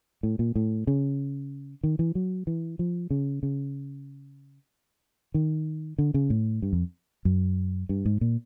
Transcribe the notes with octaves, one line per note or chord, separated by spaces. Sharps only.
A2
A#2
A2
C#3
D#3
E3
F#3
E3
F3
C#3
C#3
D#3
D3
C#3
A2
G2
F2
F#2
G2
G#2
A#2